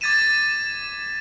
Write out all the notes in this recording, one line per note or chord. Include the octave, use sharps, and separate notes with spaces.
D6 G#6 A6 B6 D#7 E7